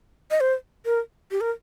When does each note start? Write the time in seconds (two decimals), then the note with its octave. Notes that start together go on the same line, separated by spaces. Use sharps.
0.31 D#5
0.40 C5
0.86 A#4
1.31 G4
1.41 A#4